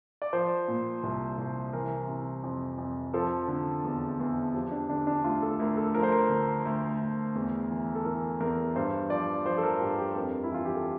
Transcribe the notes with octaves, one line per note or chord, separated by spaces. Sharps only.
D5
F3 C5
A#2
C2
C2
E3 A#4
C3
F2
F2
F3 A4
D3
E2
E2
F3 G4
D4
D3 D4
D4
D2 F4
A4
D2 A#4
A4
F3 A#4
C5
A#4
D3
D2
D2
E2
E3
A4
E3 A#4
E2 A#4
G2 C5
F3 D5
F3 C5
A4
A#4
G2 G4
G4
F2 A#4
E4
E3 F4
G4
A4